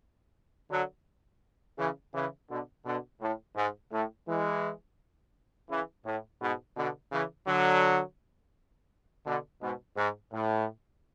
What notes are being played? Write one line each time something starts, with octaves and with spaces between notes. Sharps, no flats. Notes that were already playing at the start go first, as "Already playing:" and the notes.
D3 F#3
C#3 E3
C#3 E3
B2 D3
B2 D3
A2
G#2
A2
E3 G#3
C#3 E3
A2
G#2 B2
B2 D3
C#3 E3
D3 F#3
B2 D3
G#2 B2
G#2
A2